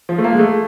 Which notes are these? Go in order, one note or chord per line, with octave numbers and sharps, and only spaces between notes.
F3
A3
A#3
G#3
A3